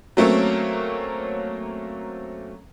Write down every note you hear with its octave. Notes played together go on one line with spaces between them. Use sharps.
F#3 A3 A#3 C4 C#4